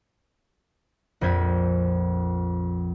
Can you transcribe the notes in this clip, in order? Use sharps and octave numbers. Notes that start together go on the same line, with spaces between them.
A#1 F2 G6 G#6 B6